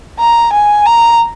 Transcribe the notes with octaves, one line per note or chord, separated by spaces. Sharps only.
A#5
G#5
A#5